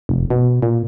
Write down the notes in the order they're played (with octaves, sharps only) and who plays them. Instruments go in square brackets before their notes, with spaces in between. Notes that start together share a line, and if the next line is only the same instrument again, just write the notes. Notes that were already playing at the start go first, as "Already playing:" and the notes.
[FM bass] F1
B2
A#2